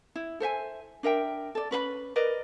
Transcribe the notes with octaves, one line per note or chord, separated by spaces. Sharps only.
E4
A4 C5 E5 G#5
D4 A#4 E5 G5
A4 D5
C#4 B4 C5 B5
A#4 B4 D5 D#5